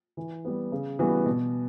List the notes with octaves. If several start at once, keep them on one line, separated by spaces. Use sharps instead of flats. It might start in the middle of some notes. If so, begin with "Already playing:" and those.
E3
G3 B3
C#3
E3 G3 B3 F#4
B2